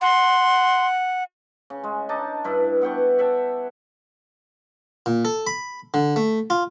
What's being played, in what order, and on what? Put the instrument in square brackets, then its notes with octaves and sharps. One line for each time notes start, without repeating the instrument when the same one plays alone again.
[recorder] F#5 [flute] C6
[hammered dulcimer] C#3
G#3
D4 D#4 D#5 A5
G2 E4 B4
B3 F#5 G5 C#6
E5 F#5 G5 A5
[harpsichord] A#2
A4
B5
D3
A3
F4